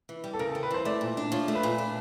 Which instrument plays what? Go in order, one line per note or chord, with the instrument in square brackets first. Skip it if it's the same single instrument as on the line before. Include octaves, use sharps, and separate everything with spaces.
[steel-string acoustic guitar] E3
G3
[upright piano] A4
[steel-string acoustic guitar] C#3 [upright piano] A#4
[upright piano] A4
[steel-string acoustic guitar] C4
[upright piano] B4
[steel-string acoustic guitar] E3 [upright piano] C5
[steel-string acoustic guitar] A3 [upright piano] D5
[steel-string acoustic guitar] A#2
D4
[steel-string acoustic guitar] F3 [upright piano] C#5
[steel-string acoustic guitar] A3
[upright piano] B4
[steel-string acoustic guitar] A#2
D4